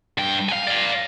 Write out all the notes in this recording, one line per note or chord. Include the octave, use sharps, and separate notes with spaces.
G2 G5
F5 G#5
D5 F5